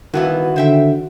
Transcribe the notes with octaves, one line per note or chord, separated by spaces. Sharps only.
G2 D#3 E3 B3 F#4
D3 C5 E5 G5